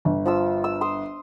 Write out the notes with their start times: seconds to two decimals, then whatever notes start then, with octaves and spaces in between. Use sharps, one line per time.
0.05 G1
0.25 F3 F4 E6
0.64 E6
0.81 C6 D#6